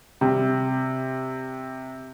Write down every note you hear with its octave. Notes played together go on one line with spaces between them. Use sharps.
C3 G3